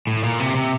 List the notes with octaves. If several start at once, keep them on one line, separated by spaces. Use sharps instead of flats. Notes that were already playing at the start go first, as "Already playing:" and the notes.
A2
A#2
C3
C3